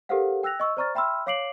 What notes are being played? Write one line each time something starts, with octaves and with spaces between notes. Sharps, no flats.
G4 A4 A#4 C5 F5 F#5
G5 E6 F#6 A#6 F7
D#5 C#6 E6
C5 D5 A#5 C#6 F6 A6
E5 G5 B5 C6 E6 F6
C#5 F5 D6 C7 D7 F#7